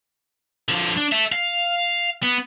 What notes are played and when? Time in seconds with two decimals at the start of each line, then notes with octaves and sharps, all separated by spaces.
0.69 D3 F3
0.98 D4
1.12 A4 E5
1.32 F5
2.23 B3